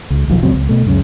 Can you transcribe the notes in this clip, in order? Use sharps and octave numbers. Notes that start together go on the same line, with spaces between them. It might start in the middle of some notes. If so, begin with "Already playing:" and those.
C#2
D#1 B1 F3
F#1 C#2 F#3 C4
C#2
B2 A3
C#2 F#2 C#3